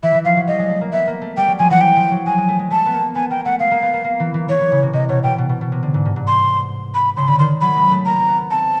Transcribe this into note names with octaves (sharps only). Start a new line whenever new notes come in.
E3 E5
E3
F3 F5
F#3
G3 D#5
G#3
A3
A#3
B3 E5
A#3
A3
G3 G5
F#3
F3 G#5
E3 F#5
G5
F3
F#3
G#3 G#5
G#3
A3
G#3
A3 A5
B3
A#3
B3 G#5
A#3 G5
A3 F#5
G#3 F5
A#3
B3
A#3
A#3
E3
E3
E3 C#5
E3
C#3
C3
C3 D#5
B2 C#5
B2 G5
B2
B2
B2
C3
D3
G#2
G2
G#2
C6
B5
C#3 C6
D3 B5
D#3 C6
F#3 B5
G#3
A3
A#3 A#5
C4
B3
C4 A5